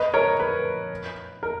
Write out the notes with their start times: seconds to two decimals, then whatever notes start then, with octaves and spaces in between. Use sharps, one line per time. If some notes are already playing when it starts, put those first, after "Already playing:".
Already playing: B4 D#5
0.14 A#4 C#5
0.40 B4
1.43 A#4